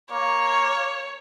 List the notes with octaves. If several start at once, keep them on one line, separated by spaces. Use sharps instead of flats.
A#3 C#5